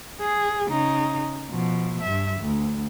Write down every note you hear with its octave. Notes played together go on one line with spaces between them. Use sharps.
G#4
C#3 D#4
B2 F3
G2 E5
D2